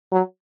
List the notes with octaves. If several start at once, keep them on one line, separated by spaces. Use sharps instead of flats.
F#3